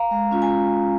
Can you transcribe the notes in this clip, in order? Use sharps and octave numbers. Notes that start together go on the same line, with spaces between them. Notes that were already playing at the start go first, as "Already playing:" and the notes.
Already playing: F5 A#5
G#3
C#4 F4
G#5